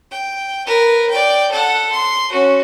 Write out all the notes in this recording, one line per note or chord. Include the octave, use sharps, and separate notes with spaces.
G5
A#4 B4
D5 G5
A4 F#5
C6
C#4 F#4